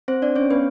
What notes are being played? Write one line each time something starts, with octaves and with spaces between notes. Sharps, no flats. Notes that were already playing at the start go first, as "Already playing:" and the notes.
C4 C5
D4 D5
C#4 C#5
B3 B4